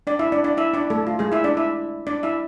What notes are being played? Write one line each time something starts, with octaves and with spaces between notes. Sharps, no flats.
D4 D5
E4 E5
D4 D5
D4 D5
E4 E5
D4 D5
A3 A4
F4
G#3 G#4
E4 E5
D4 D5
E4 E5
D4 D5
E4 E5